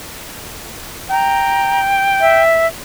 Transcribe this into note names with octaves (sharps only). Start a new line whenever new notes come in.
G5 A#5
E5